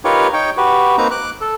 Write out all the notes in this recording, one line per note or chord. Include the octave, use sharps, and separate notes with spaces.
D#4 F4 G4 A#4 B4 C#5
D#4 C#5 G5
F#4 G4 B4
A#3 C4 D#4 B4 A#5
D6 F#6
A4